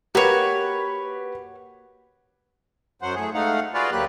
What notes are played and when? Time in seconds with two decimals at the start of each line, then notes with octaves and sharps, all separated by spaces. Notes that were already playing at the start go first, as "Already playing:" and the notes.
0.15 A#3 F#4 G4 B4 C#5
3.02 F#2 F#3 C5 F#5
3.15 A2 G#4
3.34 G#2 A3 D#4 F5 F#5
3.74 F4 F#4 G#4 B4 D5 F5
3.92 D2 F#3 A#3 G4 B4 F#6